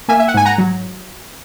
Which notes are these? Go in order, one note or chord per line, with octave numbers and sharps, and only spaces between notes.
A#3 E5 G#5
E5
F#5
G#2 G#5
F#5 A#5
F#3